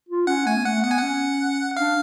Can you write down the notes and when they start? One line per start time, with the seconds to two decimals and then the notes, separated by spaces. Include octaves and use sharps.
0.09 F4
0.27 C#4 F#5
0.46 A3 G#5
0.56 B3
0.65 A3 F#5
0.84 B3 F#5
0.91 G#5
0.98 C#4 F#5
1.77 D4 F5